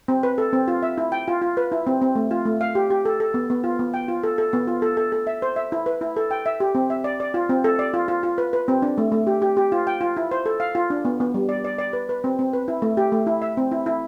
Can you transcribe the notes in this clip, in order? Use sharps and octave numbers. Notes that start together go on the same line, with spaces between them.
C4
B4
A4
C4
F4
E5
E4
G5
F4
F4
B4
E4
C4
C4
A3
F4
A3
F5
G4
G4
A4
A4
B3
B3
F4
B3
G5
F4
A4
A4
B3
F4
A4
A4
A4
E5
C5
E5
E4
B4
E4
A4
G5
E5
G4
C4
E5
D5
D5
F4
C4
A4
D5
F4
F4
F4
B4
B4
C4
D4
A3
A3
G4
G4
G4
F4
G5
F4
E4
C5
A4
F5
F4
D4
B3
B3
G3
D5
D5
D5
B4
B4
C4
C4
B4
E4
A3
G4
A3
E4
E5
C4
E4
E4